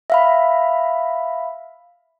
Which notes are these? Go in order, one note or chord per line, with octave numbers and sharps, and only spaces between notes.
E5 F5 B5